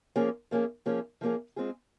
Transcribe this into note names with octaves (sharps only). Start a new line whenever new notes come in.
F3 A#3 C#4 G#4
F3 A#3 C#4 G#4
F3 A#3 C#4 G#4
F3 A#3 C#4 G#4
G#3 C4 F4 G#4